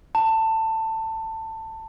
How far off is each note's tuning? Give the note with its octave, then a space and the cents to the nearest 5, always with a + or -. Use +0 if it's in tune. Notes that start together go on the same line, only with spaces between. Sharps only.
A5 +20